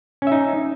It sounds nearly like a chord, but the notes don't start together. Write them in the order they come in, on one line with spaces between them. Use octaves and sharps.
C#4 E5 D#4